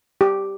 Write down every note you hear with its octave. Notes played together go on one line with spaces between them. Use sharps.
G4